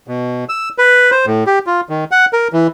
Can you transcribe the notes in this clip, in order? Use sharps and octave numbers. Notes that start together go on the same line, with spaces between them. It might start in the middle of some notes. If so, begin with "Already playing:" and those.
B2
E6
B4
C5
A2
G4
F4
D#3
F#5
A#4
E3